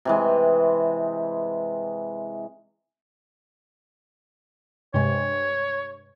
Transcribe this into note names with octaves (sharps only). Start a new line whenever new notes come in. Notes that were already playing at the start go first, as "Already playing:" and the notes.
C3 E3 G#3
G2 C3 G#3 C#5